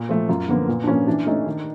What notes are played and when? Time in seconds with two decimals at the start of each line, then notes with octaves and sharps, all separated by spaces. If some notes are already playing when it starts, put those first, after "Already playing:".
Already playing: A#2
0.09 F3 A3
0.29 F#2 F4
0.48 D3 F3 A#3 B3
0.68 A#2
0.83 D4
0.87 F3 A#3 C#4
1.07 E3 D4
1.26 A3 C#4 D#4
1.46 D#3